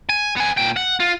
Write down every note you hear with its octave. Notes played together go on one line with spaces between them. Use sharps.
G#5
B3 G#5
A#2 G5
F#5
F4